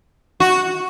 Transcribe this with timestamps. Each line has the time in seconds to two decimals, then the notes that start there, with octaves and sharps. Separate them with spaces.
0.40 F#4